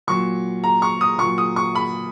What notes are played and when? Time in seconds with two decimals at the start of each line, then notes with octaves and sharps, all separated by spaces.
0.07 A#2 F#3 C#6
0.64 A#5
0.82 C#6
1.01 D#6
1.19 A#2 F#3 C#6
1.38 D#6
1.56 C#6
1.75 B5